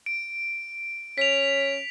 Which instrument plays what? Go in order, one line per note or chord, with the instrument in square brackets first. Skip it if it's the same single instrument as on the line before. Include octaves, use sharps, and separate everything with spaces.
[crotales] D7
[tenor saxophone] C#4 [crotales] B6 F7